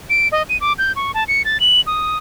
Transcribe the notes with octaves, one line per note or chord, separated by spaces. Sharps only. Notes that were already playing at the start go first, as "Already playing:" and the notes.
D7
D#5
D#7
D6
G6
C#6
A5
C#7
A6
F#7
D#6